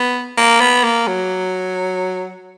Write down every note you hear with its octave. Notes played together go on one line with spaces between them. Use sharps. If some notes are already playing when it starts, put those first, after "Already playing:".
Already playing: B3
A#3
B3
A#3
F#3